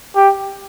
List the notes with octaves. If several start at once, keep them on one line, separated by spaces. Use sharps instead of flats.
G4